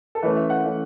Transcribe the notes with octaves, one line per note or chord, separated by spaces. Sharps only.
A4
E3 A3 C#4 B4
E5
F#5
E3 A3 C#4